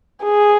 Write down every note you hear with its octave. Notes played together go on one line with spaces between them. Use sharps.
G#4